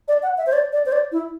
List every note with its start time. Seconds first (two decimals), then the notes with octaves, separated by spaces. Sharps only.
0.08 D5
0.23 F#5
0.38 E5
0.46 C5
0.53 D5
0.73 D5
0.86 C5
0.92 D5
1.12 E4